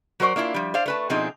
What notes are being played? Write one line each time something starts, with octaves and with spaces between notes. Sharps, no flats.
F#3 F#4 A#4 C5 D5
A#3 D4 E4 F4
F3 G3
C5 D5 F5
A3 B4 A5
B2 F3 C4 D4 D#4 G#4